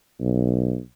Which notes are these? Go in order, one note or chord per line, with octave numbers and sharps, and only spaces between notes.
B1